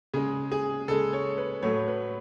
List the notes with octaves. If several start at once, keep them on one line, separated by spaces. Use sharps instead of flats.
C#3 G#3 G#4
G#4
C#3 G#3 A4
C#5
B4
A2 F#3 A3 C#5
B4